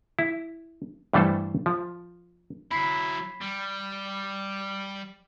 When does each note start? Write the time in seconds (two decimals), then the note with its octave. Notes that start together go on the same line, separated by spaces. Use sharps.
0.19 E4
1.13 G2 E3 G3 A3 A4 C5
1.66 F3
2.71 F#3 E4 B5 B6 C7
3.42 G3